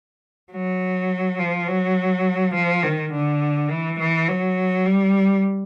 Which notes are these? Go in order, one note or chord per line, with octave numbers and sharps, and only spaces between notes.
F#3
F3
F#3
F3
D#3
D3
E3
E3
F#3
G3